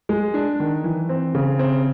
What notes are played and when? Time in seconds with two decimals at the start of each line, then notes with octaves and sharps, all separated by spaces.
0.09 G#3
0.34 D4
0.60 D#3
0.84 E3
1.09 C4
1.35 C#3
1.59 C4